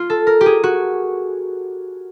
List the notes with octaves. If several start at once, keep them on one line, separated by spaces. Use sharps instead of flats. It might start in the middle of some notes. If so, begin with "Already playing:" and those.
Already playing: F4
A4
A#4
G4
G#4
F#4